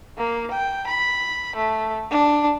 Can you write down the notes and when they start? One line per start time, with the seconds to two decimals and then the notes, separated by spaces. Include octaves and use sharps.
0.18 A#3
0.51 G5
0.87 B5
1.56 A3
2.11 D4